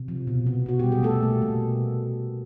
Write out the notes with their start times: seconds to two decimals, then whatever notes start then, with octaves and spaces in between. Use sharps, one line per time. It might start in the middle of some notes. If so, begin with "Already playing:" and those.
Already playing: C3
0.08 F3
0.27 B2
0.46 B3
0.66 B2 F#4
0.79 G3 G4
0.92 G#4
1.03 B2 A3 A4
1.23 A#3
1.42 B2